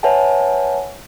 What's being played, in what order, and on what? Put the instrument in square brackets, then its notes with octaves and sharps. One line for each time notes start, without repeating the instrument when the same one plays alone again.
[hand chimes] B4 C#5 E5 F#5 G#5 A5